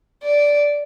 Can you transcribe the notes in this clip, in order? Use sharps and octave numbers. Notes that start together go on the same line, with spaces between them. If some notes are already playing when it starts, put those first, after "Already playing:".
D5